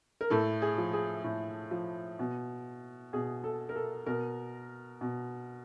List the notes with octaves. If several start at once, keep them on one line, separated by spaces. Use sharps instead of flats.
A#4
A2 A4
G#4
F3
G#4
A2
F3
B2
B2 G#4
A4
A#4
A4
B2 A#4
B2